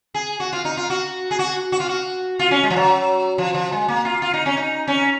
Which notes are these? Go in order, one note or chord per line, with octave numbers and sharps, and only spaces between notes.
G#4
F#4
F4
D#4
F4
F#4
G#4
F#4
F#4
F4
F#4
F4
C#4
G#3
F3
F#3
F3
F3
G#3
A#3
F4
F4
D#4
C#4
D#4
C#4